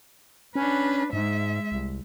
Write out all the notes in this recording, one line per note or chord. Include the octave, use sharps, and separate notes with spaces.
C#4 D4 B4
G#2 G#3 E5
C2